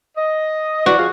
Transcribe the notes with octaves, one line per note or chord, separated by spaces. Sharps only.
D#5
E3 F#4 D5
F3 F4 G#4